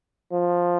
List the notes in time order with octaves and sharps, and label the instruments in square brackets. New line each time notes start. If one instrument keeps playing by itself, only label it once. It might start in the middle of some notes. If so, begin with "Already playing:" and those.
[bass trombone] F3